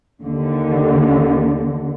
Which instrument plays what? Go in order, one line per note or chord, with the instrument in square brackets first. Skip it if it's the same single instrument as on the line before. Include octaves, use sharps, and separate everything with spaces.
[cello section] D#2 D3